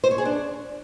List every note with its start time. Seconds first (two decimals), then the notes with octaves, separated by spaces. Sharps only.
0.04 C5
0.11 C#5
0.18 G#4
0.25 D4